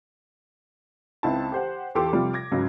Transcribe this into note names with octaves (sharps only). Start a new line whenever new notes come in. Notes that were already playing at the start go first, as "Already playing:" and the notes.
C#2 C4 D#4 E4 A5
G4 C5 F#5
E2 F4 G4 A4 C6 D6
C3 F3 G3 F4
D6 G#6 A#6
C#2 G#2 C#3 F#3